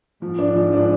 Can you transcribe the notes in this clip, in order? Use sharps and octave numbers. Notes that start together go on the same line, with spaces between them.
G#2 F3
D4
F3
D4